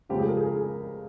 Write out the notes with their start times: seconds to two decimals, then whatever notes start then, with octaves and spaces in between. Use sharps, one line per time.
0.09 C#2 C#3 F3 G4
0.19 G#4
0.28 A#4
0.37 G#4
0.45 A#4
0.55 G#4